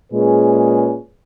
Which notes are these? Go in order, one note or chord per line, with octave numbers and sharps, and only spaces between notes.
A#2 G#3 C#4 G#4 B4